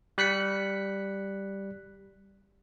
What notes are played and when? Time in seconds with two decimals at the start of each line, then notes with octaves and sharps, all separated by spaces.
0.18 G3 F#6 B6 C#7